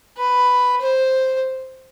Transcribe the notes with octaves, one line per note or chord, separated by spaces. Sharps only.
B4
C5